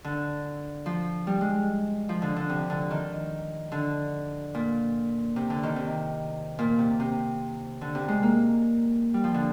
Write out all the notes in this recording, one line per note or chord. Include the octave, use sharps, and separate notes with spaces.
D3
F3
G3
G#3
F3
D3
D3
C3
D3
D#3
D3
A#2
C3
D3
D#3
C3
A#2
C3
C3
D3
C3
G#3
A#3
G3
F3
D3